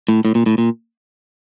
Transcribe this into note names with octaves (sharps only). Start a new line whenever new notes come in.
A2
A2
A#2
A2
A#2